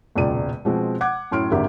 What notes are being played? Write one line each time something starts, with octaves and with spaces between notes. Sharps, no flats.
E1 C#2 A#2 D5 D#7
B2 F3 G#3 C4
F#5 D6 G#6
F#2 A2 C6 F6 D7
G#1 D3 A#3 G4 E5